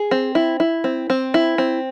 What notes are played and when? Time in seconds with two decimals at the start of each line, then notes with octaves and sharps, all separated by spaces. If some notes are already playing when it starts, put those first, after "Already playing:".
Already playing: G#4
0.11 C4
0.35 E4
0.60 E4
0.84 C4
1.10 C4
1.34 E4
1.58 C4